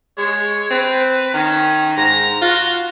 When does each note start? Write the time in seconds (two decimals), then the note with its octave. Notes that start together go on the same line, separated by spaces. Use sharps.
0.18 G#3 C#5
0.71 C4 B4
1.34 D#3 C#4
1.97 G#2 A#5
2.42 F4 F#4